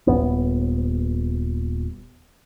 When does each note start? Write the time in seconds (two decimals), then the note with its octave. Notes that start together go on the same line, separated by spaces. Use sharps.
0.07 D#1 E2 B3